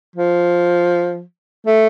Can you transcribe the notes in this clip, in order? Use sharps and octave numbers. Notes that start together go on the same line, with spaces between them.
F3
A3